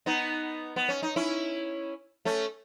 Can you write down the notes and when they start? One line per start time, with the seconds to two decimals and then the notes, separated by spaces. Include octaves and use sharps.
0.06 B3 D#4
0.76 B3
0.89 C#4
1.02 D#4
1.16 C#4 E4
2.25 A3 C#4